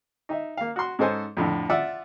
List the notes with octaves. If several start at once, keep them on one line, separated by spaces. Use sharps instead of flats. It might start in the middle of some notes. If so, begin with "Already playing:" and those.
D#4 E5
A#3 F5
F#4 C6
G#2 C#4 A4 C5 D#5 G#5
F2 A2 D3
F4 D5 E5 F#5 D6 E6